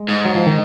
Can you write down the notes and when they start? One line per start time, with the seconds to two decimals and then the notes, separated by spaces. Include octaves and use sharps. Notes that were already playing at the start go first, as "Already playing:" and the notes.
Already playing: G#3
0.08 G#2
0.25 F#3
0.35 F3
0.47 D#3